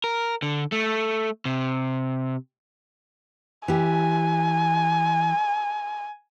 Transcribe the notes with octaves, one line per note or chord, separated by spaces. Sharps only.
A#4
D3
A3
C3
E3 G4 G#5